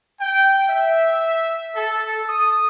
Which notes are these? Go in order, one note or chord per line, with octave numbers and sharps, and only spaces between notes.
G5
E5
A4
D#6